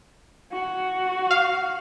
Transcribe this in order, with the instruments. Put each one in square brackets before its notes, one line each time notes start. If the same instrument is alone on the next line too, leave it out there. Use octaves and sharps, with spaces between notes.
[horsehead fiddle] F#4
[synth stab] F5